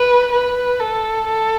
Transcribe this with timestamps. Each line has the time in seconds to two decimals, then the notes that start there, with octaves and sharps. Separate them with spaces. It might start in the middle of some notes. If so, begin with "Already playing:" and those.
Already playing: B4
0.32 B4
0.80 A4
1.27 A4